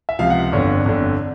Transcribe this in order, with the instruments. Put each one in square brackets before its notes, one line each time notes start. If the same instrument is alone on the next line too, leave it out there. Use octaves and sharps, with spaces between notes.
[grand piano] E5
C#2 C3 F3 F5
F#5
G1 F2 D3 C#5
G1 F2 D3